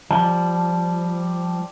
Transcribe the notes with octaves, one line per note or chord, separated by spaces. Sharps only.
F3 G3